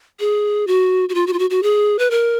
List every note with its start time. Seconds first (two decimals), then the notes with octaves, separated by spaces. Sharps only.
0.20 G#4
0.67 F#4
1.09 F#4
1.14 F4
1.27 F#4
1.33 F4
1.39 F#4
1.50 F#4
1.63 G#4
1.99 B4
2.11 A#4